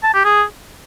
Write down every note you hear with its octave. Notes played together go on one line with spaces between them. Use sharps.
A5
G4
G#4